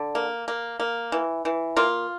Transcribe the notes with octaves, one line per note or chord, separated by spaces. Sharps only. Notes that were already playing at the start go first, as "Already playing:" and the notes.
Already playing: D3
A#3
A#3
A#3
E3
E3
A#3 F4